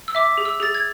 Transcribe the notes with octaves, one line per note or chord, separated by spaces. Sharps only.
E6
E5 D6
G#4
E6
G#4 A6
G#6